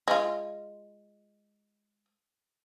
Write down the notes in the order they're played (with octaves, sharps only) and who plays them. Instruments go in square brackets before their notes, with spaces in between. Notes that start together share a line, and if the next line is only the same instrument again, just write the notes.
[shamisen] G#3 F4